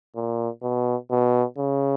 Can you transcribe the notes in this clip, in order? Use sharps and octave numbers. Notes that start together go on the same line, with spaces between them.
A#2
B2
B2
C#3